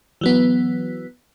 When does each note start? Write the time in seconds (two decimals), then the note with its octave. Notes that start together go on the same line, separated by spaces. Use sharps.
0.21 E3 F#3 B3